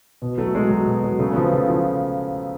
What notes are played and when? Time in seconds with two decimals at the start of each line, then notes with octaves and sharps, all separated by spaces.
0.22 B2
0.38 F#3 A3
0.54 F#3 G#3
0.71 F#3
0.86 B2
1.03 F#3
1.19 C#3 A3
1.32 F3 B3
1.44 A3
1.53 C#3
1.68 F3